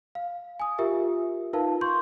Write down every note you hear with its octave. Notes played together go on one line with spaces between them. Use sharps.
F5
G#5 D#6
F4 G4 A#4 E5
D#4 F4 A#4 B4 F5 A5
C6 C#6 G6